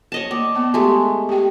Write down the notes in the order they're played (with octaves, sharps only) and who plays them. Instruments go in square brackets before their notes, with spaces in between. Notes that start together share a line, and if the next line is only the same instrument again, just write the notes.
[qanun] C#5 D#5 A5
[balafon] A#3 [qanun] D5
[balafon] B3 A5
[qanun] G#3 A3 [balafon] G4 A5
[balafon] G4 G5